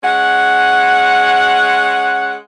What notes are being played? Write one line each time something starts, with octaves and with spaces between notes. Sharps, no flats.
G#3 C#4 F#5